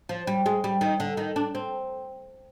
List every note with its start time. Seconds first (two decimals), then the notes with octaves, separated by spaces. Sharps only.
0.09 F3
0.27 G3
0.46 G#3
0.64 G3
0.81 D#3
1.00 D3
1.17 D#3
1.36 D4
1.55 C4